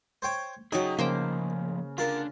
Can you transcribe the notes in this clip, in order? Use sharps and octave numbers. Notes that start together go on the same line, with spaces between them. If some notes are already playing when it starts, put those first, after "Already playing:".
C5 C#5 G5
C#3 F#3 D#4 G#4 G5 D#6
A2 C#3 F3 A#3 C5 G5
D3 D4 F4 A#4